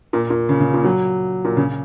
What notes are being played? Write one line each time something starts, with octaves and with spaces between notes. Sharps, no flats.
A#2
A#2
C#3
C#3
A#2
F#3
A#2
C#3